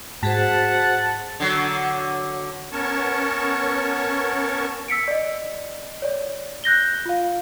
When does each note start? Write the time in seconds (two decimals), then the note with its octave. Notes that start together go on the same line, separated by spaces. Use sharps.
0.23 G#2 F#4 G#4 C5 F#5 A5 B6
1.40 D3 F#3
2.72 B3 C#4 A#4 C#5 A5 C#6
4.88 E6 B6 C#7 D7
5.08 D5 D#5
6.02 C#5 D5
6.64 F#6 G6 A#6 G7
7.06 F4 F5